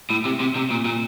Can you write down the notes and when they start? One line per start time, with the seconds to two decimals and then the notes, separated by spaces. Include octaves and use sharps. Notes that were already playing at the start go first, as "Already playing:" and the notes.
0.10 A2
0.25 C3
0.40 C3
0.56 C3
0.71 A#2
0.85 A#2